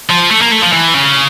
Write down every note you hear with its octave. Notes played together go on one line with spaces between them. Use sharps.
F3
A3
A#3
A3
F3
E3
C#3